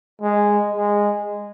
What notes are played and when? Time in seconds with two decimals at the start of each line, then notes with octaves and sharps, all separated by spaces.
0.22 G#3
0.74 G#3